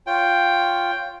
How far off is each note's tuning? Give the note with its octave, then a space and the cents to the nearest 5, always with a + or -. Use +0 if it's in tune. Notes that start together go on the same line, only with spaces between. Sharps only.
F4 +0 C#5 +0 G5 +5